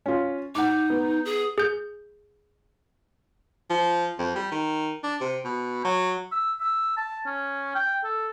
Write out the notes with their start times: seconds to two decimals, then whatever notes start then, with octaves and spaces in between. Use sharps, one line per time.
0.06 C#4 F4
0.55 D#4 F#5 D6
0.90 B3
1.25 G#4
1.58 G#4 G6
3.70 F3
4.19 F2
4.36 G3
4.52 D#3
5.04 D4
5.21 C3
5.45 B2
5.85 F#3
6.31 E6
6.60 E6
6.97 A5
7.26 C#4
7.75 G5
8.04 A4